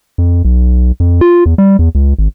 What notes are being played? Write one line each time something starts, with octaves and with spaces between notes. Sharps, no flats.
F2
B1
F2
F4
E2
G3
E2
C#2
G#1